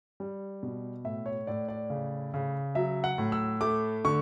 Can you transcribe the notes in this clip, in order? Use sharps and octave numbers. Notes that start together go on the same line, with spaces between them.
G3
B2
A2 E5
C#5
A2 D5
D5
C#3
C#3
F#3 E5
F#5
A2
E6
A3 D6
D3 C#6